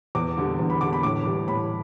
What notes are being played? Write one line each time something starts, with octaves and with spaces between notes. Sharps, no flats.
E2 D6
D3 G3
E2
B5
D3 G3 D6
B5
A2 D6
E3 G3
A2 B5